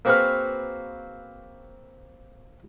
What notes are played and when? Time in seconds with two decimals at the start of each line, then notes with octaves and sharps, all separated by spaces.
0.05 A#3 C4 F#4 G#4 B4 F5